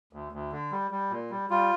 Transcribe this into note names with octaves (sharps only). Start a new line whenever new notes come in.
D2
D2
D3
G3
G3
A#2
G3
G3 F4